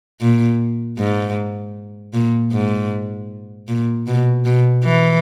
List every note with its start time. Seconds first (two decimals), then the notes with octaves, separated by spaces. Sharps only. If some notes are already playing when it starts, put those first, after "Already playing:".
0.21 A#2
0.98 G#2
2.14 A#2
2.52 G#2
3.68 A#2
4.07 B2
4.45 B2
4.84 E3